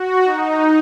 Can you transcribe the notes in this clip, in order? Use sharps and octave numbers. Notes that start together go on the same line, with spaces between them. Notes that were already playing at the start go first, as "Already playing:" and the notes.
Already playing: F#4
D#4